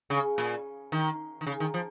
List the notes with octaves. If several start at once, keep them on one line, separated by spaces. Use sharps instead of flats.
C#3
A#2
D#3
D#3
C#3
D#3
F3